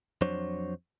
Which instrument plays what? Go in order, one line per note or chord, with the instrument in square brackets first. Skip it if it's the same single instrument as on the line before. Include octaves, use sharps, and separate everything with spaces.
[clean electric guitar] F2 F#3 D4 C5 C#5